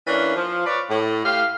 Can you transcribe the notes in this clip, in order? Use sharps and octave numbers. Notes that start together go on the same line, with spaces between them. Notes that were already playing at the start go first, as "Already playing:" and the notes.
E3 A#3 C#4 D4
F3
B4 C#5 D5
A2
A2 G4 F5